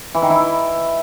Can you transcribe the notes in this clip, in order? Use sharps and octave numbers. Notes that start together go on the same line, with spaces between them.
E3
D#3
E4